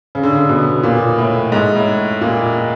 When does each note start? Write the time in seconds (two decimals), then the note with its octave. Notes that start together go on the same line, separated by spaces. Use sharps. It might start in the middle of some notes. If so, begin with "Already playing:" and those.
0.15 C#3
0.23 D3
0.32 C#3
0.49 B2
0.83 A#2
1.18 A2
1.52 G#2
1.75 A2
2.21 A#2